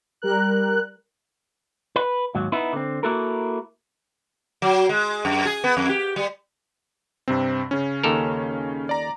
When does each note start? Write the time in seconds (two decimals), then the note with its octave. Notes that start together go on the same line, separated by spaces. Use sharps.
0.22 G3 A#4 F#6
1.96 B4
2.35 D#2 G#2 F#3
2.52 B3 D#4 E4
2.73 D3 C4
3.03 A#3 E4 F#4 A4 A#4
4.62 F#3
4.89 G#3
5.25 F#2
5.45 G#4
5.64 B3
5.77 F2
5.89 G4
6.16 G3
7.28 G2 C3 C4
7.71 C#3 C#4
8.04 D#2 A4 A#4
8.89 D5 A#5